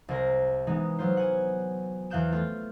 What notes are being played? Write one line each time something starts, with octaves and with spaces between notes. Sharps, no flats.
C2 A#4 C5 C6 A#6
E3 G#3 B3 D#4
F#3 B3 F4 C5
F#5 G#5
E2 E3 F5 F#6 G6 E7
A3 F4